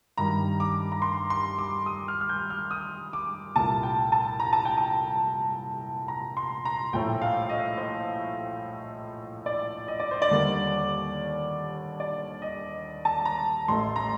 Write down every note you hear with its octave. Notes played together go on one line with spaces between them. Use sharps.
G2 D#3 G3 A#5
D6
A#5
C6
C6
D6
D#6
F6
F6
G6
F6
D#6
D6
C2 A#2 A3 A5
G5
A5
A#5
A5
G5
A5
A#5
C6
A#5
A#1 A2 A3 G5
F5
D#5
C5
D5
D#5
D5
C5
D5
D#2 D3 G3 A#3
D5
D#5
A5
A#5
A1 A2 A3 C6
A#5